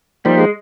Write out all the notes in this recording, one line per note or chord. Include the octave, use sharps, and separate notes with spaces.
F3 G3 A#3 D#4 G4 C5
G#3